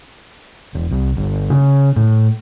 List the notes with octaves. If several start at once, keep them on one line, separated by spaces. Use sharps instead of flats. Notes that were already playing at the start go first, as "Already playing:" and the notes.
E1
C2
G1
C#3
A2